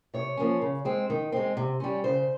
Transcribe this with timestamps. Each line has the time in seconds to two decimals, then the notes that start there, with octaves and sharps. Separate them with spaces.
0.14 C3 C#5
0.37 F3 A#3 C#4
0.62 C#3
0.85 G#3 C4
1.10 D#3
1.32 G#3 C4
1.57 C3
1.80 G3 C#4
2.04 C#3 C5